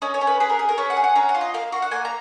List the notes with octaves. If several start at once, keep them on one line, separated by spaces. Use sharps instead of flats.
C#4 D#5
C#5
C#4
B4
G#4 B4
A#4
G#4
A#4
C#4 B4
F#5
G#4
F#5
C#4 A#5
F#5
F4
D#5
A#3 F5
F#4 F5
F#5
A#3 G#5
A#5